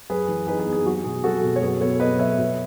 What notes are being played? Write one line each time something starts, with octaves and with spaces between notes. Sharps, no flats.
F#2 G#4 B4
E3
D#4 G#4 B4
G#4
B3
G#4
F#3 F#4
B2 G#4
F#3 F#4 A4
B2
C#5
F#2 G#4 B4
B3 A4 C#5
B3 B4 D#5
F#2 C#5 E5
B2